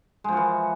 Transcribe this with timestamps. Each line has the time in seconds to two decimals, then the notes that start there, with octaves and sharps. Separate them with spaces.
0.24 G#3
0.28 F3
0.33 F#4
0.37 E3